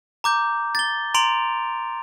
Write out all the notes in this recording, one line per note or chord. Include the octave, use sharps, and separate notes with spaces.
A#5 D6 G6
A6 G7
A#5 C6 D7 F7